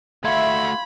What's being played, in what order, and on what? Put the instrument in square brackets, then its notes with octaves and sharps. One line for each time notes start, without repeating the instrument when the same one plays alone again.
[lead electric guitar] A3 F#4 [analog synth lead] E5 [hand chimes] F5 C6 G#6 [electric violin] B5